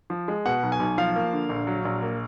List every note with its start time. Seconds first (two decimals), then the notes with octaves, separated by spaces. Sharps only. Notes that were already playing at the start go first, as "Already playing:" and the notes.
0.10 F3
0.28 G#3
0.45 B2 F#5
0.63 B1
0.72 G#5
0.80 B1
0.98 F3 F5
1.15 A#3
1.33 D3
1.49 A#1
1.67 F#3
1.85 A#1
2.02 A#3